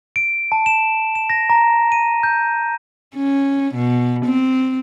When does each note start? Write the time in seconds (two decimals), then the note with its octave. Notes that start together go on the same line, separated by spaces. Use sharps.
0.16 D7
0.52 A5
0.66 E7
1.15 E7
1.30 A#6
1.50 A#5
1.92 D#7
2.23 G6
3.15 C#4
3.75 B2
4.25 C4